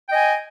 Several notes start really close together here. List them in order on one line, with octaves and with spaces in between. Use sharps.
G5 D#5 G#5